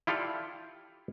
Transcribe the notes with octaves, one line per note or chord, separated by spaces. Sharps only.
E4 F4 G4 A4 D5 F5